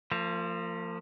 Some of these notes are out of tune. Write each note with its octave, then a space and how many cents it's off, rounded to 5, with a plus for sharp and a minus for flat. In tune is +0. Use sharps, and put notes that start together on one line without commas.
F3 +0 A#3 -45